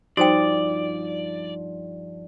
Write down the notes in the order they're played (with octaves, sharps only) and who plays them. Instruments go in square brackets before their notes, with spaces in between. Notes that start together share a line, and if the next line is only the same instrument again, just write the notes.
[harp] G2 F3 [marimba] D#4 [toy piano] F#4 C5 G5 [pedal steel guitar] D5